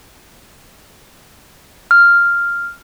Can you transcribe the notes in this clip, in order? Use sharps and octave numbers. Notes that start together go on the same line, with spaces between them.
F6